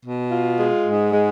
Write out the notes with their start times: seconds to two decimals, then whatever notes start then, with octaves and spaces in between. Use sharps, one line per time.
0.04 B2
0.32 F4
0.59 G#3
0.85 G#2
1.12 G#3